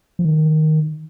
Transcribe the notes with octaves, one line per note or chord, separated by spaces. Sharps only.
F3
D#3